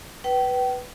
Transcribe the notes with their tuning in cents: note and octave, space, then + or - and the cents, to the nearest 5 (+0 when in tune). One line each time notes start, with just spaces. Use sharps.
B4 +0 G5 -35